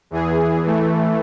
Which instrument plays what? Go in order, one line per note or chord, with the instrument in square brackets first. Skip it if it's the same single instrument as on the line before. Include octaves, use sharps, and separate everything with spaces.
[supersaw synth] E2 E3 G#4
E3 A3